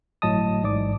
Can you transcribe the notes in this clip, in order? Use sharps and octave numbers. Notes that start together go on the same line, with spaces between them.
G1 A2 F#3 D#5 A5 D#6
A1 G#2 D5 D6